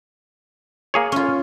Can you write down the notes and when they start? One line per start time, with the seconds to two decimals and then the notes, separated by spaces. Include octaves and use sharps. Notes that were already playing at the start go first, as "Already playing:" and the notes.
0.94 A#3 G#4 C#5
1.12 C#4 F4